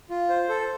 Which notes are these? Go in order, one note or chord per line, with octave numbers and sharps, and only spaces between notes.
F4
C5
A4